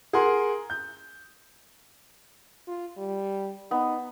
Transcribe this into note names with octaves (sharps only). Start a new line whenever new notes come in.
G#4 A#4 F#5 C6
G6
F4
G3
B3 D#4